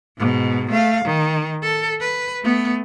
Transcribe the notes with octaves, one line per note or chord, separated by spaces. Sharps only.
G#2 B2
A3 F5
D#3
A4
B4
A3 B3